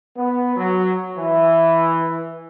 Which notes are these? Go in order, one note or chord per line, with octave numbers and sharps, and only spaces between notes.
B3
F#3
E3